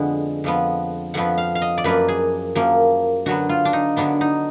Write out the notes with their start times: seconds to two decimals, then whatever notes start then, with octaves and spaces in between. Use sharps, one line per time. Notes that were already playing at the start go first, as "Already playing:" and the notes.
Already playing: F2 D3 G#3 B3 F#5
0.44 F2 F3 B3
1.14 F2 F3 B3 F#5
1.38 F5
1.55 F5
1.62 D#5
1.78 D5
1.84 F#2 F3 A#3 B4
2.08 G#4
2.55 F#2 F3 A#3
3.26 D3 F#3 B3 F#4
3.49 F4
3.65 D4
3.73 D#4
3.96 D3 F#3 B3 D4
4.21 D#4